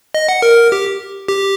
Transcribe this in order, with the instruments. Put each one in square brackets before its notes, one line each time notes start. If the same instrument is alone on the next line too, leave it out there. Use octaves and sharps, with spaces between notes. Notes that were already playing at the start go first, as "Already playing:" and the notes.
[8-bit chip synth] D#5
F#5
A#4
G4
G4